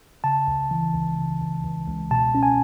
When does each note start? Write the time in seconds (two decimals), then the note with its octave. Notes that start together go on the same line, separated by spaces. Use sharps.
0.24 C#3 A5
0.47 C#2
0.71 E3
0.94 C#2
1.17 C#3
1.41 C#2
1.65 C#2
1.88 C#2
2.11 B2 A5
2.35 C#4
2.43 G#5